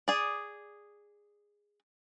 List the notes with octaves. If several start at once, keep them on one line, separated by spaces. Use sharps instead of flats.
G#4 D5